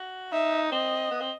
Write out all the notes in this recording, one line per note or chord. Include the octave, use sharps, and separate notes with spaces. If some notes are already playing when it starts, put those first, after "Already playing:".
Already playing: F#4
D#4 E5
C4 D#5
B3
C4